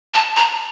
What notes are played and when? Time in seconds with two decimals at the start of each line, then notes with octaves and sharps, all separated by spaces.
0.14 A5
0.36 A#5